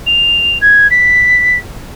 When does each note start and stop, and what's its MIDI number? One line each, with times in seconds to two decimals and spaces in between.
0.06 0.58 101
0.61 0.87 92
0.90 1.57 95